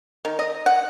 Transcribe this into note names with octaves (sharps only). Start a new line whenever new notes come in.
D#3
D#5
F#5